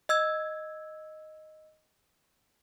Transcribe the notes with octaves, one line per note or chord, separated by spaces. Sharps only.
D#5 E6 G#6